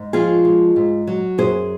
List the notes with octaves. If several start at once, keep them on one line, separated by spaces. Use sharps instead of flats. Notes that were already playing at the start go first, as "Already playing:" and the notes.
Already playing: G#2
F3 F4 G#4
G#3
G#2
F#3
F#2 G#4 C5